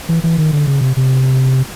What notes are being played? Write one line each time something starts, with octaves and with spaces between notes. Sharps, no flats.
E3
E3
D#3
D3
C#3
C3
C3